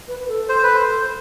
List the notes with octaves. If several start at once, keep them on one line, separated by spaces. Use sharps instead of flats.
B4
B4
A4
C5
B4
C5